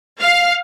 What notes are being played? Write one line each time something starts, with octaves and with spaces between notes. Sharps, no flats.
F5